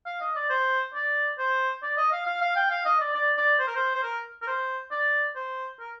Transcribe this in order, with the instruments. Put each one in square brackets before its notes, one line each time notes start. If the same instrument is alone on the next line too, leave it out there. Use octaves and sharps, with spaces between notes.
[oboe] F5
D#5
D5
C5
D5
C5
D5
D#5
F5
F5
F5
G5
F5
D#5
D5
D5
D5
C5
A#4
C5
C5
A#4
A#4
C5
D5
C5
A#4